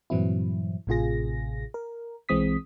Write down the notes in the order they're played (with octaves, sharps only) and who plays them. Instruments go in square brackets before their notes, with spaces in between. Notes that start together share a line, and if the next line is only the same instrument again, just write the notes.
[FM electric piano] G2 A#2 E3 F#3 C4 E4
A1 A2 C3 F4 G#4 A#6
A#4
B1 E3 G#3 C4 D#6 B6